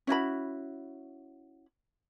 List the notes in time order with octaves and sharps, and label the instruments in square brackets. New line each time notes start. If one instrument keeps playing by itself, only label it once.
[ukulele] C#4 E4 F#4 B5